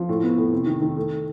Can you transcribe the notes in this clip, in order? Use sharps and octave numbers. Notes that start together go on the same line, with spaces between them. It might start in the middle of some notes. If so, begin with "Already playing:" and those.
Already playing: F3
A2
B3
A2
C3
D#3
D#3
A3